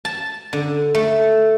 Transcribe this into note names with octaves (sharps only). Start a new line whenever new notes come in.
A5
D3
A3